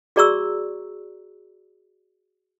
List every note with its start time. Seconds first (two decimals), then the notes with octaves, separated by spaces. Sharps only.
0.16 F#4 G#4 D5 A#5 C#6 E6